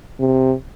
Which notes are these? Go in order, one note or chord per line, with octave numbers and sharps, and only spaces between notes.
C3